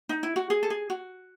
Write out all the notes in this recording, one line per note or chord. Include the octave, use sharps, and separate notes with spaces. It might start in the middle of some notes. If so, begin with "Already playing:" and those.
D#4
E4
F#4
G#4
A4
G#4
F#4